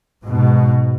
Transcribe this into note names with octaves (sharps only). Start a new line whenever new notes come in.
G#2 B2